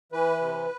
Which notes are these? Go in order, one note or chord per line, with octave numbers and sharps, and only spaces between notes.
E3 B4
C3